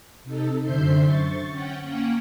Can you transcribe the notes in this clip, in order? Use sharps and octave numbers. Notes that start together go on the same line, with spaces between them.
C3 D#4 A4
F#2 D3 C5 E5 G6 C7
C#6 A6
C#4 F#5 G5
A#3 C#4 F#5 G5